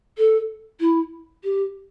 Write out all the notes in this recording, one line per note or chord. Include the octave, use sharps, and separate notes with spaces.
A4
E4
G4